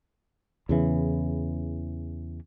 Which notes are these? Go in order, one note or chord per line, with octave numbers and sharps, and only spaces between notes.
E2 C#3 E3